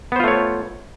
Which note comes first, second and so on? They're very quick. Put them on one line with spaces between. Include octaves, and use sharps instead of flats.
B3 C5 F4 A3 C#5